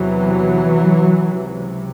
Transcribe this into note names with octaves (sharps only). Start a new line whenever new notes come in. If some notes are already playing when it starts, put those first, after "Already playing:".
Already playing: E2 C3 E3 F#3
C#2 C3